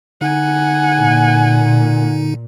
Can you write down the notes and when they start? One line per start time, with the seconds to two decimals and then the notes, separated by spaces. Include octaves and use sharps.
0.21 D3 D#4 F#5 G#5
0.99 A#2